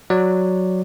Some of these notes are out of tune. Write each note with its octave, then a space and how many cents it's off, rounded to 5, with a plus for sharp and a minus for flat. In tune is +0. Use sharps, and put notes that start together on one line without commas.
F#3 -5 D5 +0